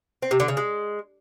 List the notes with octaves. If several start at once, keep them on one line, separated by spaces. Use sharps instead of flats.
C4
C3
D3
C#3
G#3